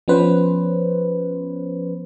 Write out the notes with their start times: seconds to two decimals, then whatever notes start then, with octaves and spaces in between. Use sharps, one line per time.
0.08 F3 B3 C#4 B4 C5